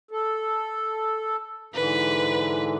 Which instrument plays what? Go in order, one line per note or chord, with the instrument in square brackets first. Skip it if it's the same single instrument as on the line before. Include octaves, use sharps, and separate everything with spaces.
[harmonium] A4
[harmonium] G#2 D3 E3 [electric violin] B4